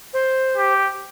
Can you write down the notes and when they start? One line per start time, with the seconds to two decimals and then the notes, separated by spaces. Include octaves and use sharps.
0.14 C5
0.57 G4